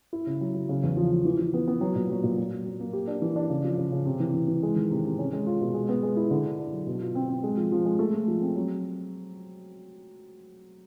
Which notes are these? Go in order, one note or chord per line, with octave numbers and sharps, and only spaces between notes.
E4
C#3
F#3
F#3
C#3
E2
F3
F3
E3
E3
B3
B3
F#3
A#2
F#3
A#2
F#3
F#3
F#3
A#3
G4
D4
E3
D4
C#3
F3
C#3
C#3
C3
E3
E3
E3
G#3
D#3
C3
C3
C#4
G#3
F4
B2
G#3
B3
G#3
E4
D3
D4
D4
F#3
B2
F4
C4
C4
G#3
F3
F3
G#3
A3
A3
F3
C4
F#3